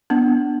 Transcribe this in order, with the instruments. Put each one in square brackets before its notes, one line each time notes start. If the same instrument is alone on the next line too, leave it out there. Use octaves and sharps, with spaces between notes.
[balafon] B3 D4